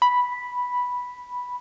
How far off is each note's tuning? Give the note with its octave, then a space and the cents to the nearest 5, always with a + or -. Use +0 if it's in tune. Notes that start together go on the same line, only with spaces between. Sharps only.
B5 -5